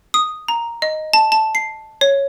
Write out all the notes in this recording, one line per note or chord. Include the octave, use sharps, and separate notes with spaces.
D#6
A#5
D#5
A5
A5
C7
C#5